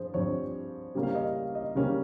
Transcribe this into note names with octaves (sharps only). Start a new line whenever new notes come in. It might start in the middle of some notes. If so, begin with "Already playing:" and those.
Already playing: G2 F3 G#4 C5
G2 F3 C4 C#5
C#3 G3 A#3 C#4
F5
D#5
F5
D#5
C#3 G3 A#3 C#4